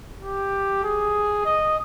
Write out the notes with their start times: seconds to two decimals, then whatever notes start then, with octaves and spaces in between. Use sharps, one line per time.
0.22 G4
0.83 G#4
1.45 D#5